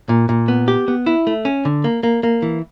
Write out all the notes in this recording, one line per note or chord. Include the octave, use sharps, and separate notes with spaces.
A#2
A#2
B3
G4
B3
E4
A3
C#4
D3
A#3
A#3
A#3
E3